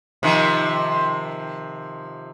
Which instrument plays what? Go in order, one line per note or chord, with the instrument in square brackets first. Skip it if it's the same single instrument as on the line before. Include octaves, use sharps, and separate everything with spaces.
[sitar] C3 D#3 F3